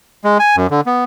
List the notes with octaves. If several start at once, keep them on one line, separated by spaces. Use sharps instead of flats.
G#3
G#5
F#2
D3
B3